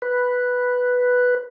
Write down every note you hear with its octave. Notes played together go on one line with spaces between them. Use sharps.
B4